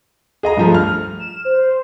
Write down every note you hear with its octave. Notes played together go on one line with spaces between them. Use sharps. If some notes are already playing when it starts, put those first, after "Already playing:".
G#4 D#5 A#5
G2 F3 A3
F6
E7
C5